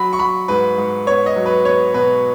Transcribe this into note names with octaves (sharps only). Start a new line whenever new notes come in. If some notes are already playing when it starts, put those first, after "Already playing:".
Already playing: F#3 B5
C#6
F#3 B5
G#2 B4
G#2
B3 C#5
D#5
F#3
B4
B3 C#5
B2 B4